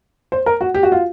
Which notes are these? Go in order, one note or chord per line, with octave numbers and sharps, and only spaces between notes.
C5
A#4
F#4
G4
F#4
F4